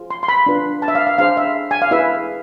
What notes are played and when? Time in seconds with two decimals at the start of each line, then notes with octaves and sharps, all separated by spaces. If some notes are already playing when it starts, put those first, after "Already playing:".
Already playing: F4 G#4 C5
0.10 C6
0.23 C6
0.28 B5
0.46 D4 F4 B4
0.82 A5
0.88 E5
0.95 F5
1.07 F5
1.18 D4 G#4 C5 F5
1.37 E5
1.71 G#5
1.82 F5
1.91 E4 G#4 B4 E5